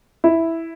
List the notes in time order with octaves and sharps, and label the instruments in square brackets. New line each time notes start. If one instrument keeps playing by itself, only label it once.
[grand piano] E4